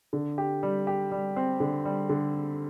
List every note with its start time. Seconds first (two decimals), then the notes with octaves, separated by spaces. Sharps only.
0.13 D3
0.38 G4
0.63 G3
0.87 G4
1.12 G3
1.36 C4
1.60 D3
1.85 G3
2.09 D3